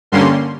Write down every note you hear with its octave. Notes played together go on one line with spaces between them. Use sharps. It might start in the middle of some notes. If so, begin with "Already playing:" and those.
G2 D3 G3 A#3 C#4 C6